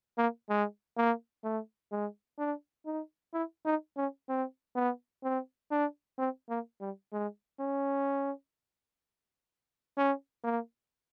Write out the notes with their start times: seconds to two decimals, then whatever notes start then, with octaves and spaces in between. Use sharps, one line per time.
0.18 A#3
0.49 G#3
0.97 A#3
1.44 A3
1.92 G#3
2.38 D4
2.86 D#4
3.33 E4
3.66 D#4
3.97 C#4
4.29 C4
4.75 B3
5.24 C4
5.71 D4
6.19 C4
6.50 A#3
6.81 G3
7.13 G#3
7.60 C#4
9.97 C#4
10.44 A#3